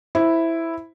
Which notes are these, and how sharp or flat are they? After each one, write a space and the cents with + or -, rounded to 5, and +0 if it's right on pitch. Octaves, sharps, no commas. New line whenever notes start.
E4 +0 C5 +0